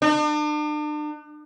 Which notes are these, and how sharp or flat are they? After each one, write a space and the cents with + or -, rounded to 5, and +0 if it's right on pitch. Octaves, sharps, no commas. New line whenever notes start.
D4 +40